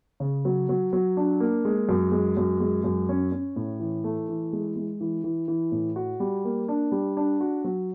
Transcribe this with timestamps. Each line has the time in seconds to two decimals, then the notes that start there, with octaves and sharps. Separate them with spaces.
0.20 C#3
0.45 F#3
0.69 F#3
0.93 F#3
1.17 D4
1.40 A#3
1.65 G#3
1.89 F#2
2.12 G#3
2.37 F#2
2.60 G#3
2.84 F#2
3.09 C#4
3.32 C#4
3.56 A2
3.80 E3
4.04 A3
4.29 E3
4.53 G#3
4.76 G#3
5.01 E3
5.24 E3
5.48 E3
5.72 A2
5.96 F#4
6.20 G3
6.45 A#3
6.68 D4
6.92 G3
7.17 D4
7.40 F#4
7.64 F#3